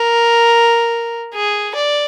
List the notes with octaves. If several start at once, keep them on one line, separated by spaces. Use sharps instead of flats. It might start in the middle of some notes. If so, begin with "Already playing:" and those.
Already playing: A#4
G#4
D5